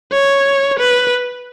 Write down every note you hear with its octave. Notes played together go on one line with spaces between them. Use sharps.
C#5
B4